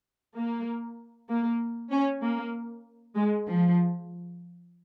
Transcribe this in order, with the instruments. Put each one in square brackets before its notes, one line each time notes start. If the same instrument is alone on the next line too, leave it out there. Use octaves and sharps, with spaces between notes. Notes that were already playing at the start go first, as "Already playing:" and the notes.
[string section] A#3
A#3
C#4
A#3
G#3
F3